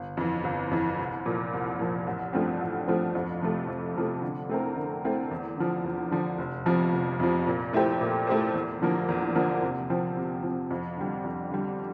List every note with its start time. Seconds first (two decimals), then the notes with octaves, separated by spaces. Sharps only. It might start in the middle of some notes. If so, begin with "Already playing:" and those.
Already playing: G1
0.17 F2 E3
0.44 G1
0.71 F2 E3
0.98 C2
1.26 A#2 F3
1.53 C2
1.79 A#2 F3
2.07 A1
2.33 G2 F3 A3 C4
2.61 A1
2.87 G2 F3 A3 C4
3.15 F2
3.41 C3 F3 A3
3.68 F2
3.96 C3 F3 A3
4.22 D3
4.49 A3 C4 E4 A#4
4.76 D3
5.04 A3 C4 E4 A#4
5.31 E2
5.57 D3 F3
5.84 E2
6.11 D3 F3
6.38 F1
6.66 F2 C3 F3
6.92 F1
7.20 F2 C3 F3
7.47 A#2
7.73 A3 E4 G4 C5
8.01 A#2
8.27 A3 E4 G4 C5
8.54 E2
8.82 D3 F3 A#3
9.09 E2
9.35 D3 F3 A#3
9.62 C3
9.90 F3 C4
10.17 C3
10.43 F3 C4
10.70 F2
10.98 D3 G3
11.24 F2
11.51 D3 G3